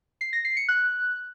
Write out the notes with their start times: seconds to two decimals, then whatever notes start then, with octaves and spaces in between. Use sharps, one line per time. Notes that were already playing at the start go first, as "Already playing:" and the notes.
0.21 C7
0.33 A#6
0.45 C7
0.57 C#7
0.69 F#6